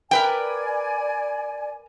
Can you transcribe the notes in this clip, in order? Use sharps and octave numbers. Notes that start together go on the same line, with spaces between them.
A#4 B4 D5 G5 G#5